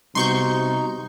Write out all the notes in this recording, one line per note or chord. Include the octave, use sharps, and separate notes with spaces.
C3 G3 B3 D#4 F#4 C6 C#6 G6